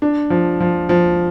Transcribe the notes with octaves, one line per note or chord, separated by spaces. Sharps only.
D4
F3
F3
F3